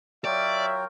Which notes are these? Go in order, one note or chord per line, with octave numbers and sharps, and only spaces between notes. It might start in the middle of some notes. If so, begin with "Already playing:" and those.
F#3 F4 A#4 C#5 D5 E5 G5